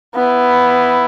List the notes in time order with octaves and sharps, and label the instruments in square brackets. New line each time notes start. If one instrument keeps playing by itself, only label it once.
[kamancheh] B3 [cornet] E4